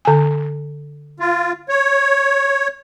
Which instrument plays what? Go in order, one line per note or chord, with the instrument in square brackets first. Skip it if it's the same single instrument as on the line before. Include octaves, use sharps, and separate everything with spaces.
[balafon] D3 G#5
[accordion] F4
C#5